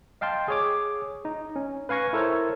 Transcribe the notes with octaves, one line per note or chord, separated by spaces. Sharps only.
D#5 F5 G5 A5 C6
G#4 C#5 D6
D#4
C#4
B4 F5 G#5 C#6 A#6
E4 A4 A#4 C5 C#5